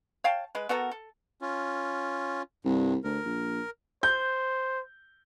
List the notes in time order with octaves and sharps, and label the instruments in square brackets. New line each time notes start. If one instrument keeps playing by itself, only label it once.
[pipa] C#5 F5 G5 A5
G#3 B4
B3 F#4 A4 A#4
A4
[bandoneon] C#4 F4
[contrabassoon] C2 [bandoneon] G2
[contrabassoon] D2 [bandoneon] A#4
[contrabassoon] A#1
[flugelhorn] C5 [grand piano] G6